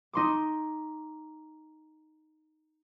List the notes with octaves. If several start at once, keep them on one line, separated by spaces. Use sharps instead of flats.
D#4 C6 D6